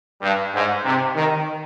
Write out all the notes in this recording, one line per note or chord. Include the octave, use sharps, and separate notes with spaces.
G2
G#2
C3
D#3